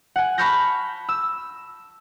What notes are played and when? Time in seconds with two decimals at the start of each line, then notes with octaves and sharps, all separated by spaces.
0.16 F#5 G#5
0.38 A5 B5 C#6 F6 G6 A#6
1.09 E6